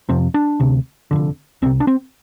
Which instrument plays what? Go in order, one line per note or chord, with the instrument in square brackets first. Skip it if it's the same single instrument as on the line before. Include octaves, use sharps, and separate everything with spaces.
[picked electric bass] F1 F2 C3 C4
D4
D2 C3
F1 F2 D3
C2 C4
C3
D4
C4